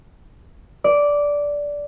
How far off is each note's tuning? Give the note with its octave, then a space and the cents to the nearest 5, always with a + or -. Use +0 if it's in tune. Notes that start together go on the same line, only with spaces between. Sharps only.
D5 -10